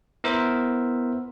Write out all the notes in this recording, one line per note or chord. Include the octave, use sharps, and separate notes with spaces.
B3 E4 A#4 C5 E5